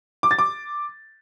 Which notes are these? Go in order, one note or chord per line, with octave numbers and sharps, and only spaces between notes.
D6
A6
D6